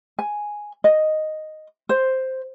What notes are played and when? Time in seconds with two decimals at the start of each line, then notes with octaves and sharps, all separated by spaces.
0.19 G#5
0.84 D#5
1.89 C5